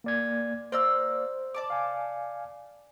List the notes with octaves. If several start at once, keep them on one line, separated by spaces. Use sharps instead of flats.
A#3 D5 G#6
A#3 C5 D5 E6
D5 A5 D6
F5 G#5